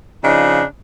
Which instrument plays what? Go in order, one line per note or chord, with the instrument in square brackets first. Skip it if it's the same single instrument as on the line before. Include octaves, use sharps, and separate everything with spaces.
[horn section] C#3 F3 D4 D#4